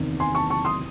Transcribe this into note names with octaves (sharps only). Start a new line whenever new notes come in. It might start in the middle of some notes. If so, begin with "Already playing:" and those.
Already playing: F#1 E2 C3 D#3
G#5 C6
A5 C#6
A5 C#6
C6 D#6